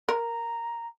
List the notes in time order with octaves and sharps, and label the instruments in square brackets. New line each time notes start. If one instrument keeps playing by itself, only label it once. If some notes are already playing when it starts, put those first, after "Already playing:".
[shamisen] A#4 [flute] A#5